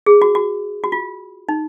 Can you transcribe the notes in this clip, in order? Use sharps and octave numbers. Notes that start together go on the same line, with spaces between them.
G#4
F#4
F#4
F#4
F4
D#4